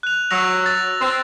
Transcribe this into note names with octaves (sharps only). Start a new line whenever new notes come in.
F#6 F7
F#3 E6 A#6 F7
A6
C4